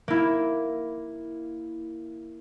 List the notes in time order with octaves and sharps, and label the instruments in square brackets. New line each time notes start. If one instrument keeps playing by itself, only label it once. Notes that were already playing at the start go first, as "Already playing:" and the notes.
[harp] A#3 E4